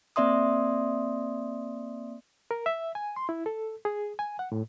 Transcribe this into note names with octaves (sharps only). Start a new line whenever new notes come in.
A#3 C4 D5 E5 C6 D#6
A#4
E5
G#5
C6
E4
A4
G#4
G#5
F#5
A2